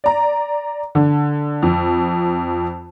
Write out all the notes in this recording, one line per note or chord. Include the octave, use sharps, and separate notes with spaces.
D5 A#5
D3
F2